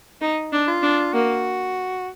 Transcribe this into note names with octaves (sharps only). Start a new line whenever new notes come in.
D#4
D4
F4
D4
A#3 F#4